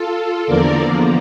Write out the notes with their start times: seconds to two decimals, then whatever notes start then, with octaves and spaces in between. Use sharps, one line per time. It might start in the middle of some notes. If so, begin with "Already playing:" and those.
Already playing: F4 A4
0.46 E2 D3 F3 A#3 A#4 D5